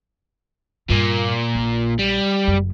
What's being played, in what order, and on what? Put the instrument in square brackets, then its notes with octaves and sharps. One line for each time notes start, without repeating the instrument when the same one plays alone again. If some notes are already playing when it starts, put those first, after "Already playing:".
[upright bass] G2 [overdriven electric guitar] A#2 A#3
[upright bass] A#1
[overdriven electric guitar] G3
[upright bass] F#1 F#2